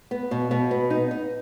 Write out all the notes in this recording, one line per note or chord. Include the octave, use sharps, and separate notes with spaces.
B3
B2
B2
B3
D#4
D#4